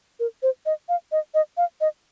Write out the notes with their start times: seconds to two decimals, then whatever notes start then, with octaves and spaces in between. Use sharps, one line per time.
0.20 A#4
0.42 C5
0.66 D#5
0.89 F5
1.12 D#5
1.34 D#5
1.57 F5
1.81 D#5